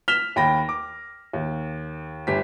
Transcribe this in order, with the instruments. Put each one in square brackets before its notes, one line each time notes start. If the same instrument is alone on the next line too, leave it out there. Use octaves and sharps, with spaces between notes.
[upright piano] F6 B6 E7 F7 G7
D#2 G5 B5 A#6
D6
D#2
G1 G4 B6